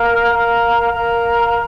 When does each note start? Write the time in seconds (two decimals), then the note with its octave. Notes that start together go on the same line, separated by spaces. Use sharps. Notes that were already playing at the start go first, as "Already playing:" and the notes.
Already playing: A#4 F5 A#5
0.32 A#4 F5 A#5
0.93 A#4 F5 A#5